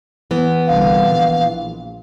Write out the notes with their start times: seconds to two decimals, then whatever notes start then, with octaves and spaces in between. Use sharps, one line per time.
0.31 E3 B3
0.68 C2 D3 F5
1.10 A#1